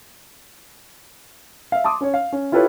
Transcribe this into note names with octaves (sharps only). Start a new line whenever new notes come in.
E5 F5
A5 C6 D6 D#6
C#4 C#5
F5
C#4
E4 F4 G4 A4 B4 C#5